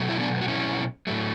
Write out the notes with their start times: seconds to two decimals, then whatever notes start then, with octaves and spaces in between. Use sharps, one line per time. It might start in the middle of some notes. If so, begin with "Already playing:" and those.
Already playing: B2 F#3 A3
0.09 E4
0.19 B3 D4
0.41 F#4
0.48 C#4 E4
1.07 A2 F#3 A3